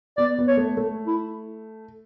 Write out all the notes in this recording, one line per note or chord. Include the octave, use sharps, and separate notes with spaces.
B3 D5
B3
C#5
A3
A3
E4